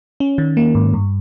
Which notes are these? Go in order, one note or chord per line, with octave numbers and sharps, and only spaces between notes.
C#4
D#3
A#3
G#2
G2